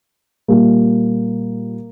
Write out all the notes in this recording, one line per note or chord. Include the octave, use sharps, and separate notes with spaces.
A#2 G3 A#3